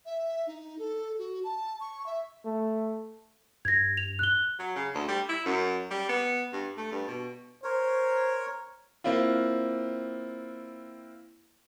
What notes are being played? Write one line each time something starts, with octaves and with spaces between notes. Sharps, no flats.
E5
D#4
A4
F#4
A5
C#6
E5
A3
G2 G#6 A#6
F7
F#6 G7
F#3
C#3
D2
G3
E4
F#2
G3
B3
G2
A3
G2
B2
A#4 C5 C#5
A#3 C4 E4 F4